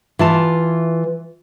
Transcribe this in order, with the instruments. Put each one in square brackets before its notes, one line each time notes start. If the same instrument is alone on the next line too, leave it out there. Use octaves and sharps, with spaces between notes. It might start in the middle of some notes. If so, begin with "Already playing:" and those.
[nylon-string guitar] E3 F4 A5